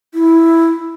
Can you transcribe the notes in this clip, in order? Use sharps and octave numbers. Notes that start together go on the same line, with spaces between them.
E4